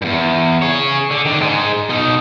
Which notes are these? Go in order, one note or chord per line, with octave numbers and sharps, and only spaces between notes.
E2 G2
G#4 C#5
D3
D#3 D4
G#2 G#3
B2 D#4